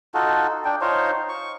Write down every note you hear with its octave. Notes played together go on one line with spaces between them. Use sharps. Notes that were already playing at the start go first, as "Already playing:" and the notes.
D#4 F4 F#4 A4
D4 G5
D#4 F4 C5 C#5
C#6